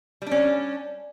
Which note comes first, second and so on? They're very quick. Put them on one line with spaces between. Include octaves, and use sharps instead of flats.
G3 D4 C#4